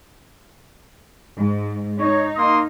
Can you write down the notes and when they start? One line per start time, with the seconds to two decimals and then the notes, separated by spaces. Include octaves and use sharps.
1.37 G#2
1.99 D#4 C#5
2.36 A#3 C6 D#6